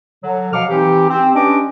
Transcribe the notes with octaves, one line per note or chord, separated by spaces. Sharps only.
D3 F#3
B2 F3 F5 F#5 D6 F6
E3 C4 D#4 G4
C4
C#4 D4 G4 B4 D#5 D6